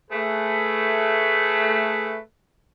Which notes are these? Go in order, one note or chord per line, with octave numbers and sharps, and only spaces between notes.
A3 G#4 B4